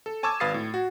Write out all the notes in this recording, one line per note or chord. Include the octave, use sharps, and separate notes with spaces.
A4
G#5 A5 C#6 D6 E6 G#6
G#1 B4 F5 D#6 A6 C7
A2
F#4